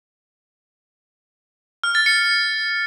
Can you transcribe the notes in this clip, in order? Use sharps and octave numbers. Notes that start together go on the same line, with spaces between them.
F6
A6
C#7